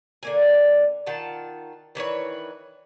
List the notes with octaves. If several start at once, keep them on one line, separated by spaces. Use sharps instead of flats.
D3 A#3 G#5
D#3 F4 F#5 A5
D#3 E3 B4 C#5